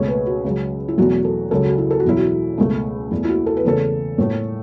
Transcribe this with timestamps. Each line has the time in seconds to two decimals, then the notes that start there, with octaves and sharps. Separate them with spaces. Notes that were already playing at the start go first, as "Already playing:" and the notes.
Already playing: C#2 B2 A3 C#5
0.08 B4
0.26 F#4
0.45 C#2 C#3 F#3
0.88 E4
0.98 E2 B2 F#3 A3 F#4
1.24 A4
1.51 C#2 C#3 F#3 A4
1.64 F#4
1.78 E4
1.91 A4
2.00 F#4
2.05 E2 B2 F#3 E4
2.17 F#4
2.58 C#2 B2 A3
3.11 E2 E3 A3
3.25 E4
3.29 F#4
3.46 A4
3.57 B4
3.65 E2 C#3 A3 A4
4.18 A2 A3